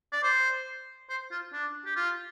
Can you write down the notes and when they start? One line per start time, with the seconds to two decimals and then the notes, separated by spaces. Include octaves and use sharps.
0.12 D5
0.23 C5
1.10 C5
1.31 F4
1.53 D4
1.86 G4
1.96 F4